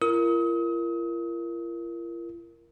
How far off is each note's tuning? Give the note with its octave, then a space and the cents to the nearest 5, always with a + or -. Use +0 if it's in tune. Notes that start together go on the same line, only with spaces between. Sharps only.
F4 -45 A#4 +0 D#6 +35